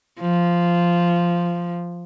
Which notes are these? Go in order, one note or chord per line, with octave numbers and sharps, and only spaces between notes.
F3